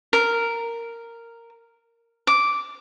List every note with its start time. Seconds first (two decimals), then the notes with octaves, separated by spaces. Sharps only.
0.13 A#4
2.27 D6